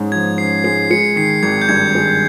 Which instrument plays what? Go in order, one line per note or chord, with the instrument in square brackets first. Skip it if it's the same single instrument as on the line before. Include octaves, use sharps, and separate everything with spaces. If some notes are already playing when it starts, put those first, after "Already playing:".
Already playing: [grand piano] G#2 G#3 C#4
[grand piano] F3 [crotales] G#6
[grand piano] C#4 [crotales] C7
[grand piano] G#3 [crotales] C7
[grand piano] G#3 [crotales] C#7
[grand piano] D#3 [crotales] C7
[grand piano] G#1 [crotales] G#6
[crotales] G6
[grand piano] G2 [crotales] G#6
[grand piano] G#3